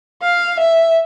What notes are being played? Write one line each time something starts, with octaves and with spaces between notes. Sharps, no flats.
F5
E5